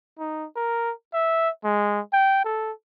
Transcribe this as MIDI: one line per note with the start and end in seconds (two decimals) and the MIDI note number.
0.19 0.46 63
0.56 0.92 70
1.14 1.50 76
1.64 2.00 56
2.13 2.44 79
2.45 2.72 69